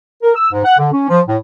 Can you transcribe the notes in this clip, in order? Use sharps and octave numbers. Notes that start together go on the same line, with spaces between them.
A#4
E6
G#2
F#5
D3
C#4
F3
A2